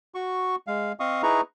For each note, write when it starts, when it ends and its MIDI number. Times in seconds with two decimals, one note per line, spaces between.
0.15 0.56 66
0.15 0.56 85
0.67 0.92 56
0.67 0.92 77
1.00 1.22 60
1.00 1.22 75
1.00 1.22 77
1.00 1.22 85
1.00 1.22 87
1.23 1.41 63
1.23 1.41 64
1.23 1.41 68
1.23 1.41 71
1.23 1.41 82
1.23 1.41 85